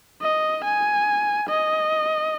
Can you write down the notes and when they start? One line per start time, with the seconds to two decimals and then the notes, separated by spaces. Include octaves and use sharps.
0.22 D#5
0.64 G#5
1.49 D#5